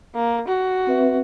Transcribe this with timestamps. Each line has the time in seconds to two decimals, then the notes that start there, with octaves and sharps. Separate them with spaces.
0.16 A#3
0.48 F#4
0.87 C4 B4 E5